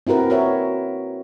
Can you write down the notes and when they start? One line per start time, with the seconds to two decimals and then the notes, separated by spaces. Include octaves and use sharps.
0.07 C4 E4 F#4 A#4 B4
0.30 F#4 A#4 C#5 E5